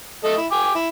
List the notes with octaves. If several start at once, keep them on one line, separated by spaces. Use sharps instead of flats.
A3 A4 D#5
E4
G5 G#5 D6
E4